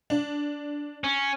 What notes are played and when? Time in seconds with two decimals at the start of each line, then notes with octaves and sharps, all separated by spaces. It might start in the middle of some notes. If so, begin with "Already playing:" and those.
0.10 D4
1.04 C#4